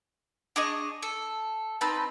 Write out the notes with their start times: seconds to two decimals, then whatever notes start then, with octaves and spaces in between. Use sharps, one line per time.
0.56 D4 G#4 D#5 C#6
1.03 A4
1.81 C4 D#4 B4 A5